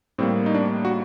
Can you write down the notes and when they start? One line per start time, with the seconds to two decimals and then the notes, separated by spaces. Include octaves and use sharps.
0.18 A2 G3 A#3 C4
0.46 D#4
0.55 D4
0.85 F#4